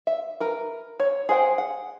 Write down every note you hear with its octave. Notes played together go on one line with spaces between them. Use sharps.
E5
A#4 B4
C#5
G#4 C5 F#5 G5
F#5